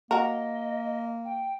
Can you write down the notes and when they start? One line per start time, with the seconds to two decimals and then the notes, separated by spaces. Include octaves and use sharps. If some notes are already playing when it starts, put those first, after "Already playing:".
0.11 A#3 F#4 A#4 D#5
1.24 G5